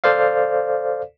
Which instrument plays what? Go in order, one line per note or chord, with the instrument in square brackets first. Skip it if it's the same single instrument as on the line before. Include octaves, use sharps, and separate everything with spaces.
[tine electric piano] A4 C5 D5 F5